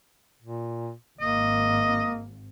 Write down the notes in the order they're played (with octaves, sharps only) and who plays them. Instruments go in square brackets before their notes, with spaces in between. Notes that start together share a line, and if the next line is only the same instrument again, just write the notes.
[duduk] A#2
[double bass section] G#1 [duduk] A#3 [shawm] D#5